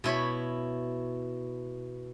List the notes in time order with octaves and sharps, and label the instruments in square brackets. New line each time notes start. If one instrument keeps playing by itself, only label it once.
[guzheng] B2 E4 C#5 B5